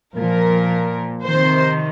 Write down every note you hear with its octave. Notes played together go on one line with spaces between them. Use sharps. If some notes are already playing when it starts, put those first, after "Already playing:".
A#2 F3 A#4
C3 D#3 C5